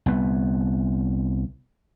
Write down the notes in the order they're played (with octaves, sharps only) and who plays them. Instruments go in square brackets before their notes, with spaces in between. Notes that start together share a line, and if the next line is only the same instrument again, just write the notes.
[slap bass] C2 B3